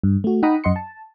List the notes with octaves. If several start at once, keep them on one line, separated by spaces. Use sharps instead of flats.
G2
A3 F#4
D#4 F#5 G5 A#5 B5 D#6
F#2 D#5 F#5 C6 C#7
A5